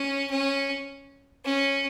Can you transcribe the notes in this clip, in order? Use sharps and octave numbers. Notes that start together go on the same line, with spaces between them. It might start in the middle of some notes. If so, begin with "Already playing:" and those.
Already playing: C#4
C#4
C#4